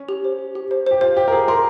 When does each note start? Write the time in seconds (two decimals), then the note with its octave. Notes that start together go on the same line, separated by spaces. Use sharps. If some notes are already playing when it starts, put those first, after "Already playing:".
Already playing: C#4
0.09 G4
0.24 C5
0.39 G4
0.55 G4
0.71 C5
0.87 G4 C5
1.01 F4 C5
1.17 G4 C5
1.28 A#4
1.32 G#4 C5
1.48 A#4 C6